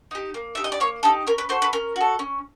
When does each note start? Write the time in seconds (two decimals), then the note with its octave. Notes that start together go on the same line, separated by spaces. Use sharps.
0.11 D#4 G4
0.34 A#3
0.55 D#4 G4 E5
0.64 D#5
0.72 D5
0.80 A#3 C#5
1.03 D#4 G4 A4
1.27 C#4 A#4
1.38 B4
1.49 F#4 A4 C5
1.62 B4
1.73 C#4 A#4
1.96 F#4 A4
2.19 C#4